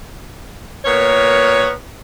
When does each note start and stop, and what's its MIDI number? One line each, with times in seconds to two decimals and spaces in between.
0.84 1.70 46
0.84 1.70 59
0.84 1.70 70
0.84 1.70 73